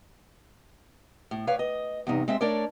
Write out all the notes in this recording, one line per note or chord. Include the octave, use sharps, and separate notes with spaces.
A2
B4 C#5 D5 F5
D#5
E2 G2 C3 D#4
G#3 C4 E5
A3 D4 A#4 C#5 D5